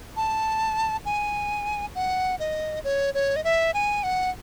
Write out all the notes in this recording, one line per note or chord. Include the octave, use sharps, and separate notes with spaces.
A5
G#5
F#5
D#5
C#5
C#5
D#5
E5
G#5
F#5